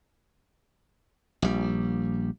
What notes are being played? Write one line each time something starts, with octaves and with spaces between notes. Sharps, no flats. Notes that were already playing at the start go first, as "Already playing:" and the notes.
A#1 G3